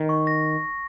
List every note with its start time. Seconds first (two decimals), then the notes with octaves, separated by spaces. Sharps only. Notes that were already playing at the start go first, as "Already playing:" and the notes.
Already playing: D#3
0.09 C#6
0.27 A#6